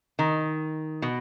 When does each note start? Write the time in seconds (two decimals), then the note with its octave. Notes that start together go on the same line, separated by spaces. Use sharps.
0.19 D#3
1.02 B2